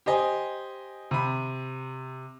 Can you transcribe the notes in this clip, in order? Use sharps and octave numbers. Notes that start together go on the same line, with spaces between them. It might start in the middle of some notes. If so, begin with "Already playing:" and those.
G4 C5 D#5 G#5
C3 B5